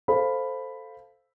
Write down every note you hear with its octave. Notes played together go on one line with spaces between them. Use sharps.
A4 C5 F5 B5